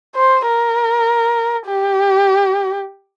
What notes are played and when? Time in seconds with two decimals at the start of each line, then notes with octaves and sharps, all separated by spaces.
0.16 C5
0.47 A#4
1.67 G4